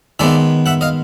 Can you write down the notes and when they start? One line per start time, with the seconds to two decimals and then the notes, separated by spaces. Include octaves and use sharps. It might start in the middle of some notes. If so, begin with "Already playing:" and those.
0.19 D#3 G#3 B3 D5 E5
0.66 E5 F#5
0.81 D#5 F5